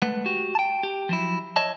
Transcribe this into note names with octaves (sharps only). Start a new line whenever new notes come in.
G#3 A3 B4 F#5
F#4 G4
G5 A5
G4
F3 F#3 E4
C#5 D#5 E5 A5